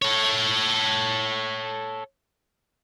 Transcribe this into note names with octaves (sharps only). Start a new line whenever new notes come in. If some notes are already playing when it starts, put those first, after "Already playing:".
A4 C#5